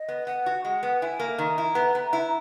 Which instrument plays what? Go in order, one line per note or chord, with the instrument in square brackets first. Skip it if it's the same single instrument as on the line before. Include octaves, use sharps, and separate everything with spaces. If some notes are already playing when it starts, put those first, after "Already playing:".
Already playing: [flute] D#5
[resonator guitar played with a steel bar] B3
[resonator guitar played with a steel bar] B3 [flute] F#5
[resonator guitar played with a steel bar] F#4
[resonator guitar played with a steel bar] G#3 [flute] F#5
[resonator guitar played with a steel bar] B3
[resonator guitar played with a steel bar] E4 [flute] G#5
[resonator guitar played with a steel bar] A#3
[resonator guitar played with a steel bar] D#3 [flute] A#5
[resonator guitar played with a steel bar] E4
B3
B3
E4